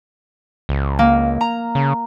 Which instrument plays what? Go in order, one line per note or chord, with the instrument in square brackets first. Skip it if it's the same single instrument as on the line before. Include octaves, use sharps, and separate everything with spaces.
[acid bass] C#2
[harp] A#3
A#5
[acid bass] C#3